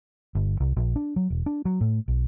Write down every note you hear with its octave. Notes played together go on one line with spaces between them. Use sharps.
G1
C2
A#1
D4
F#3
E1
D4
F#3
A2
B1